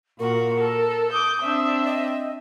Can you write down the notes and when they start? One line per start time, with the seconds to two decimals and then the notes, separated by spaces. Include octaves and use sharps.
0.19 A#2 F#4 A#4
0.59 A4
1.12 D6 D#6 G6
1.41 C4 D4 E5
1.86 D#5